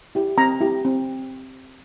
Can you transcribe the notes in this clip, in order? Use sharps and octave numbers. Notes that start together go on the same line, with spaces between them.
E4 G4
C4 A#5
E4 G4
C4